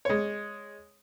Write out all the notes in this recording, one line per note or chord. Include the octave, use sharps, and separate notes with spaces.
G#3 C#5